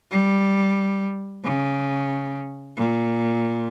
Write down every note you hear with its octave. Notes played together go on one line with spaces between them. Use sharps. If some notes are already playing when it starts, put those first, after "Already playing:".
G3
C#3
A#2